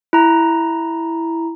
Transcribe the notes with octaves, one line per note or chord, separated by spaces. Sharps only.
E4 A#5